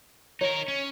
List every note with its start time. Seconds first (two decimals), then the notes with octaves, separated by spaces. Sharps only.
0.41 D#4 A#4 C#5
0.68 C#4